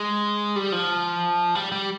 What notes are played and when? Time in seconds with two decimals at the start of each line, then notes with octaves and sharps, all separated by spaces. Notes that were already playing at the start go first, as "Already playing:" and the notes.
Already playing: G#3
0.56 G3
0.72 F3
1.55 G3
1.72 G3